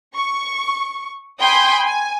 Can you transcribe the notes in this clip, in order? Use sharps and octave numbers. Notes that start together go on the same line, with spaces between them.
C#6
G5 G#5 B5 C6 D#6 G6
G#5